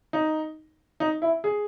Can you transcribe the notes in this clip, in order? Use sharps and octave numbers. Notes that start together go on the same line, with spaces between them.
D#4
D#4
E4
G#4